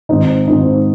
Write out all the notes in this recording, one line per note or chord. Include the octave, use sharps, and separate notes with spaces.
G#2 D#3 C4 D#4
G#2 D#3 C4 D#4